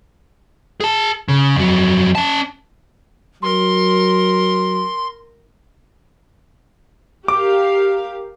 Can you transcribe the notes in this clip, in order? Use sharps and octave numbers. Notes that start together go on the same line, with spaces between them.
G#4 A5
C#3
F2 F#3
C#4 A5
F#3 A#4 C6
G4 A#4 F5 D6